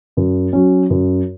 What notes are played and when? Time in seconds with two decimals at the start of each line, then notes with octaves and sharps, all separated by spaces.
0.17 F#2
0.53 F#3 C#4
0.90 F#2